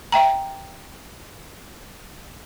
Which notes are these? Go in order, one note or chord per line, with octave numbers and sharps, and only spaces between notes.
E5 G5 A#5